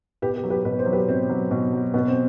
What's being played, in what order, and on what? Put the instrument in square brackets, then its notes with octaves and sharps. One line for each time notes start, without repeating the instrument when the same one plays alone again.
[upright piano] B2 G4 B4
G4 B4
F#3
G4 B4
B2 B4
C5
F#3
G4 B4
B2 C4
F#3
B2
F#3
B2 B3
C4